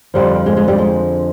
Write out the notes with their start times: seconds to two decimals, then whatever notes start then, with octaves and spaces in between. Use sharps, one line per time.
0.14 F2 D3 F3 G3
0.46 G#3
0.57 G#3
0.68 G3
0.78 G#3